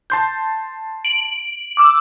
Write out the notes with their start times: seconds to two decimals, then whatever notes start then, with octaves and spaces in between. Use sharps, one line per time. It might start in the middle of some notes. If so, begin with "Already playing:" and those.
0.10 A5 C6 G6
1.05 D7 F#7
1.77 D6 E6